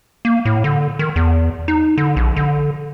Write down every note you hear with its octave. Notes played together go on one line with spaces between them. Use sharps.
A#3
A2
D3
D#3
E2
D#4
D3
A#1
D3